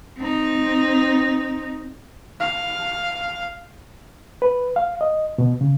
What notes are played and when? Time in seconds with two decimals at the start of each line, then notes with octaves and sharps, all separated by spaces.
0.17 C4 D#4
2.40 F5
4.42 B4
4.76 F5
5.01 D#5
5.38 B2
5.61 C#3